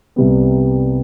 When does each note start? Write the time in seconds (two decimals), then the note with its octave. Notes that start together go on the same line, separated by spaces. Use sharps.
0.16 C2 C3 G3 B3